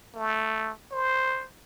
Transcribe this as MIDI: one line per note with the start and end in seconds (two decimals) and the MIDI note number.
0.16 0.71 57
0.92 1.46 72